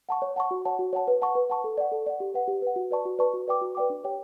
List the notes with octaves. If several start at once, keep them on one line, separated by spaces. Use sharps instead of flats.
F#5 A5 C#6
C#5
F#5 A5 C#6
F#4
C#5 F#5 A5
F#4
C#5 F#5 A5
B4
F#5 A5 C#6
B4
F#5 A5 C#6
A4
D5 F#5
A4
D5 F#5
G4
B4 F#5
G4
B4 F#5
F#4
B4 D5 A5 C#6
F#4
B4 D5 A5 C#6
F#4
B4 D5 G5 D6
F#4
B4 D5 G5 D6
D4
G4 C#5 G5